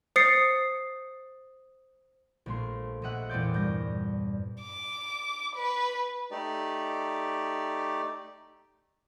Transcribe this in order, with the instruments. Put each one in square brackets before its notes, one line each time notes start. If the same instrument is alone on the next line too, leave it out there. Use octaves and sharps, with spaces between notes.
[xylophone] C5 D#6 A6 C7 C#7
[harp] A#1 A3 C6
A#1 D#5 E5 F#5 F#6
E2 A#2 C4 D5 G6
G2 G6 A#6
[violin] D6
B4
[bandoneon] A3 D#4 G4 D5